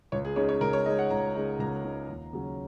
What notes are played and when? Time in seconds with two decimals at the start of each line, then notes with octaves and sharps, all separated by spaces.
0.12 C#2 C#5
0.25 G#4
0.36 C#3 G#3 D#4 C#5
0.49 C#5
0.61 C#2 A#4
0.73 C#5
0.86 C#3 G#3 D#4 D#5
0.99 F#5
1.10 C#2 A#5
1.35 C#3 G#3 D#4
1.59 C#2 A#5
1.84 C#3 G#3 D#4
2.09 D#2
2.33 C#3 F#3 C#4